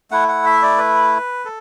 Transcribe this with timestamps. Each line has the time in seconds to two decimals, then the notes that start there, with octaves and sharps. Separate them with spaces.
0.11 A3 E4 F#5
0.28 F#5
0.46 E5
0.62 D5
0.78 B4
1.45 A4